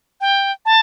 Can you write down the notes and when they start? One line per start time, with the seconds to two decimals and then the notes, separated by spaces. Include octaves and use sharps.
0.21 G5
0.66 A5